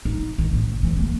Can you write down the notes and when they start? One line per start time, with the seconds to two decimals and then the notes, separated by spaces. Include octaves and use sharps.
0.05 D#4
0.38 D#3
0.52 F#1 A2
0.83 E3 F#3
0.96 D2 A#3